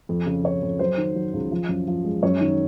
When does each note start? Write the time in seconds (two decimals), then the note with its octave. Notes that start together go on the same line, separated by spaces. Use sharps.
0.09 F2
0.26 C#3
0.44 C#3 C#5
0.62 F2
0.79 F#3 C5
0.98 D#3
1.15 F#3
1.34 C#2
1.51 F3
1.69 F#2
1.87 F3
2.05 G#3
2.23 F#2 C#5
2.41 D#3